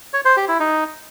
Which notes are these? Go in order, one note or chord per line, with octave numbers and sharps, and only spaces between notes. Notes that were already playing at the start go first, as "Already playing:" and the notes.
C#5
C5
G4
E4
D#4